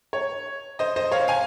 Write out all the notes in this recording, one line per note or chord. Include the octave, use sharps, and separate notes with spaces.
C#5
C5 D#5
C5 D#5
C#5 F5
F5 G#5